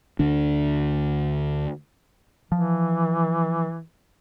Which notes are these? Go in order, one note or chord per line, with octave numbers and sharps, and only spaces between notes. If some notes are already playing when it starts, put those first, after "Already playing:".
D2 D3 D4
E3 F3